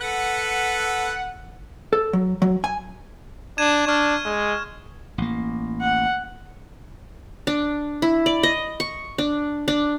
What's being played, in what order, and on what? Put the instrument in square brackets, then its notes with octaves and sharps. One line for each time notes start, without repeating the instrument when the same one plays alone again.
[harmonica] A4 B4 [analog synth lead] F#5
[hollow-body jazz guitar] A4
F#3
F#3
G#5
[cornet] D4 [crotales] G#6 D#7 E7
[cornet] D4 [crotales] C#6 F6
[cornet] G#3
[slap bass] A1 A#3
[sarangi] F#5
[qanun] D4
E4
D5
D#5
C#6
D4
D4